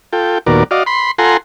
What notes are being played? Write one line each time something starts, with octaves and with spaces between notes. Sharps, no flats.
F4 A4 G5
D#2 A#2 B3 F#4 A#4 D5
F#4 D5 D#5 F5
B5 C6
F4 A4 F#5 G#5 A#5 C6